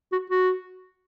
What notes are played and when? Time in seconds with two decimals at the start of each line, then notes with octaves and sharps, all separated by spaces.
0.12 F#4
0.30 F#4